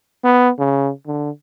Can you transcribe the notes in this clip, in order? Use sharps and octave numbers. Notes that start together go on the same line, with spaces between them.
B3
C#3
D3